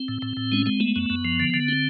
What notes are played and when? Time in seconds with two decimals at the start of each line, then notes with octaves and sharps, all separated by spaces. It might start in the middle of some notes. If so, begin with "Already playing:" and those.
Already playing: C4
0.08 A2
0.22 A2
0.37 A2
0.52 G#3 C#4
0.66 G#3 C4
0.80 A3 B3
0.96 F#2
1.10 F#2
1.25 F3
1.40 D3
1.54 D3
1.68 C4